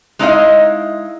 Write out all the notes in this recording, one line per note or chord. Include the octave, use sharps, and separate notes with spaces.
G#3 D#4 E4 D5 D#5 F5